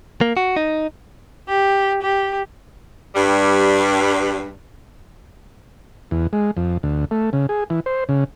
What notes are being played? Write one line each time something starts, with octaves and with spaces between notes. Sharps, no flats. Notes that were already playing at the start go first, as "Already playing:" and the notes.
A#3
F#4
D#4
G4
G4
G2 G3
E2
G#3
F2
D2
A3
C#3
G#4
E3
C5
C#3